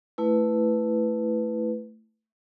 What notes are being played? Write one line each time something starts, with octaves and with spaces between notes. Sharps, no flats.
A3 E4 B4